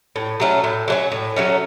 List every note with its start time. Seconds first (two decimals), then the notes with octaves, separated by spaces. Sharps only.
0.16 A2
0.40 F#3 A3 C#4
0.64 A2
0.88 F#3 A3 C#4
1.12 A2
1.36 F#3 A3 C#4